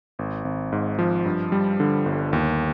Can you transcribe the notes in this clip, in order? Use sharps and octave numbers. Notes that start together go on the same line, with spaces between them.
G#1
G#1
G#2
F3
G2
G3
D3
G1
D#2